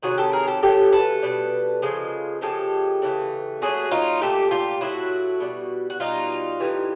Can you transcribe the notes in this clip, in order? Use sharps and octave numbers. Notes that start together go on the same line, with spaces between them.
C3 D#3 F#3 F#4 G#4
G4 A4
G#4 A#4
G4 A4
C#3 F#3 A3 G4 A4
A4 B4
B2 G3
C#3 F3 G#3
C#3 F3 G#3 G4 A4
C#3 E3 A3
A#2 F#3 A3 F#4 G#4
D#4 F4
A#2 F#3 A3 G4 A4
F4 G4
A2 F#3 A3 E4 F#4
B2 G3
F#4
B2 G3 D#4 F4
A2 E3 G3